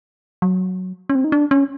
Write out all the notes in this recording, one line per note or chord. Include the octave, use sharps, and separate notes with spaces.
F#3
C#4
C4
D#4
D4
C#4